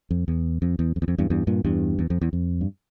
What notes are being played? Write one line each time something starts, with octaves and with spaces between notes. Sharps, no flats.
F2
E2
F2
E2
F2
E2
F2
E2 G2
E2 G2
G2 A#2
E2 G2
E2
F2
E2
F2
G2